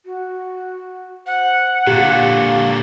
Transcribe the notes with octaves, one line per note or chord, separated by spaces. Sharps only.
F#4
C5 F#5
A#2 D3 G4 F5